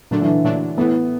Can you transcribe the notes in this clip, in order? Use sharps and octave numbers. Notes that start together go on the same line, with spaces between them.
A#2 D3 F#3 A3 D4
E3
A#2 F#3 A3 D4
A2 E3 A3 B3